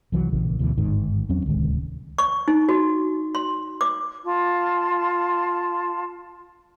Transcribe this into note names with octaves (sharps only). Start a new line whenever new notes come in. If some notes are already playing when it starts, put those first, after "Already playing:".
C2 E3 F#3
A#1 C#3 E3
D2 B2 E3
G1 G#2 D#3
E2 F#3 C4 C#4
D1 C2 D#3 G#3
C#6
D#4
F#4
C6
D6
F4 A5